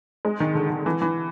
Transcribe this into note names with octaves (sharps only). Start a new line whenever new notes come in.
G#3
D#3
D3
D#3
E3
E3